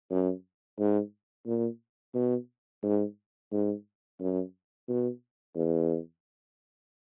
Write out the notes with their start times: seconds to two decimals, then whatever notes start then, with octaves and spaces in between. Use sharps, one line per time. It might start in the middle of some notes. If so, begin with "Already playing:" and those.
0.10 F#2
0.79 G#2
1.47 A#2
2.15 B2
2.83 G#2
3.52 G#2
4.20 F#2
4.88 B2
5.56 E2